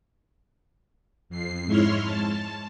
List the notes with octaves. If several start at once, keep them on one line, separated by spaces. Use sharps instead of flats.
F2 C7
G#2 G#3 E4 C#5 C6 F6
A5